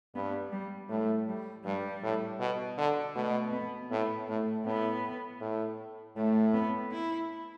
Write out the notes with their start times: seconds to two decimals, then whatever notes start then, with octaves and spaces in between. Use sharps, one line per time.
0.15 G2 B3
0.52 G3
0.89 A2 A3
1.27 G3
1.65 G2 G3
2.03 A2
2.40 B2
2.78 D3
3.15 B2 A3
3.52 B3
3.91 A2 B3
4.28 A2 A3
4.65 A2 B3
5.41 A2
6.16 A2 A3
6.54 B3
6.91 E4